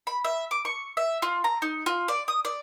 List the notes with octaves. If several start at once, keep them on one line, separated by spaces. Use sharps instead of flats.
B5
E5
D6
C#6
E5
F4
A#5
D#4
F4
D5
D#6
D5